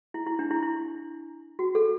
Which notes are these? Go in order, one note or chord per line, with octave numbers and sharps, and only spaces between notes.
E4
E4
D4
E4
E4
F#4
A4